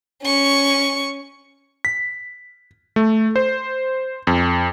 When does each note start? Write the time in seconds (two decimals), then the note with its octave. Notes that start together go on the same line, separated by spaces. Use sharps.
0.23 C#4 C#6
1.85 B6
2.96 A3
3.36 C5
4.27 F2